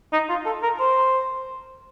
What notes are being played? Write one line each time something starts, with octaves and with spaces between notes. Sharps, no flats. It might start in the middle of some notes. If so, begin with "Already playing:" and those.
D#4
F4
A4
A#4
C5